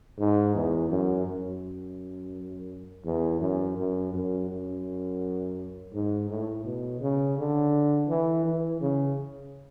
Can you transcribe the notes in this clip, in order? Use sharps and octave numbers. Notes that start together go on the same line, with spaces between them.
G#2
E2
F#2
F#2
E2
F#2
F#2
F#2
F#2
G#2
A2
B2
C#3
D3
E3
E3
C#3